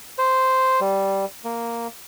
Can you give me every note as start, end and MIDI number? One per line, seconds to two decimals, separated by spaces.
0.18 0.80 72
0.81 1.25 55
1.44 1.87 58